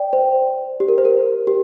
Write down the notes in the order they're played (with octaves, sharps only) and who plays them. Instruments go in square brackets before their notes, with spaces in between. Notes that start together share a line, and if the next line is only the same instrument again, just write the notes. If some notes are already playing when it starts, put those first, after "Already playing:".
Already playing: [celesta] D5 G5
C5
G4
A#4
C5
A#4
G4